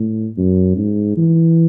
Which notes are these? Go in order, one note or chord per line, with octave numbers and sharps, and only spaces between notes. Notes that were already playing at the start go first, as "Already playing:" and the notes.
Already playing: A2
F#2
G#2
E3